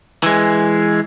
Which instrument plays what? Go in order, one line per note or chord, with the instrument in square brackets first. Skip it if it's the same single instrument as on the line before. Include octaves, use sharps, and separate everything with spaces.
[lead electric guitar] E3 G#3